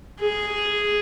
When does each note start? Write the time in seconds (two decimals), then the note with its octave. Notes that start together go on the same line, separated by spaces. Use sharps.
0.21 G#4